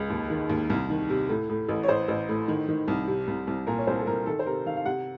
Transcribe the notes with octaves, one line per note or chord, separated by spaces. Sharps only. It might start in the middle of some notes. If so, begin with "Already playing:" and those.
Already playing: C#2
D#2
D#3
D#2
C2
D#3
C3
A2
A2
A1
C#5
A1 C5
A1
A2
D#3
D#3
C2
C3
C2
C2
A#2 A#4
C#5
C2 C5
A4
C2 A#4
D#3 A4
C5
C3 A#4
D#3 F5
F5
C3 F#5